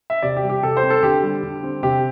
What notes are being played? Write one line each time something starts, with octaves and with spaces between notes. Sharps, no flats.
E5
C3 D5
G4
G3
G4
C3 A4
C5
C4
A4
D3 G4
G3
D3
C4
C3 G4